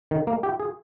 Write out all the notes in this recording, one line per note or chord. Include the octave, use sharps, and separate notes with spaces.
D#3
A#3
G4
G#4